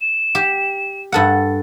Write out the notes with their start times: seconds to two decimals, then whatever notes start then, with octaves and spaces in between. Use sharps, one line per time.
0.01 E7
0.35 G4
1.12 G2 A4 F#5